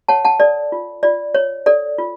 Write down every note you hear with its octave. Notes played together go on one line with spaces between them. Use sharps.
C#5 F#5 A5
F#5 A5
A4 D5
F4
F4 D5
C#5
A4 D5
F4